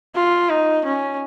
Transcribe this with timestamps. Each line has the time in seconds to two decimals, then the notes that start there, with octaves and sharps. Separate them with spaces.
0.16 F4
0.50 D#4
0.85 C#4